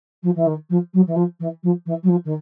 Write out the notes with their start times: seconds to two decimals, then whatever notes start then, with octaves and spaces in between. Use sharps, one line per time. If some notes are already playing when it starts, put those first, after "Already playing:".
0.23 F3
0.35 E3
0.46 D#3
0.69 F3
0.93 F#3
1.07 E3
1.15 F3
1.39 E3
1.63 F3
1.86 E3
2.03 F#3
2.08 F3
2.25 D#3